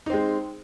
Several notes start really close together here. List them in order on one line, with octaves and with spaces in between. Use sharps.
D#4 C4 G#3